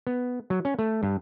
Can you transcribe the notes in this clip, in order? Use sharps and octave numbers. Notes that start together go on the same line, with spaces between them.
B3
F#3
C#4
A3
G2